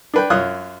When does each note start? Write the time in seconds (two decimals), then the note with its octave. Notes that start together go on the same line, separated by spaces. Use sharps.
0.14 D4 B4 G5
0.30 F#2 F4 C#5 D#6 F#6